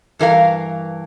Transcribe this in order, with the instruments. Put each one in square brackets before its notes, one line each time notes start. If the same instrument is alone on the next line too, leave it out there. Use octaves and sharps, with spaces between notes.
[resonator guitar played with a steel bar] G2 E3 A#4 F5